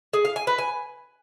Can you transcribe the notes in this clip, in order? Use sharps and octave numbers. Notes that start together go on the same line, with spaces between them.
G#4
F5
G#5
B4
G#5